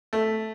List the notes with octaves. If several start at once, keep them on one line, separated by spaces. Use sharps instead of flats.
A3